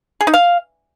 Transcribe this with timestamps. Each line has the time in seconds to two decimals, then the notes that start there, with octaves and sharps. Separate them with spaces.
0.21 G#4
0.27 D#4
0.34 F5